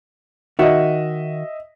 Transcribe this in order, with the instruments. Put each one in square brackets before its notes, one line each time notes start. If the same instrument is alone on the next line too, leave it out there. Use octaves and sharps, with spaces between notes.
[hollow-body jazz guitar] D#3 F#4 [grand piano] D#5 E5